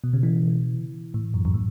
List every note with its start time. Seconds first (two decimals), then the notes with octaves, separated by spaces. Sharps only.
0.04 B2
0.13 C#3
0.23 E3
1.14 A2
1.34 F#2
1.45 F#2
1.54 A2